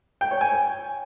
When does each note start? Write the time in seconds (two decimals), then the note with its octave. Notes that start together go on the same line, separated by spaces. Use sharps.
0.21 G5
0.31 C#5
0.41 G#5